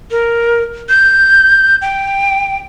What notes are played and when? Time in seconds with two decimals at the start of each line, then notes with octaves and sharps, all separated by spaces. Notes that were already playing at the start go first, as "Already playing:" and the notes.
0.11 A#4
0.89 G6
1.82 G5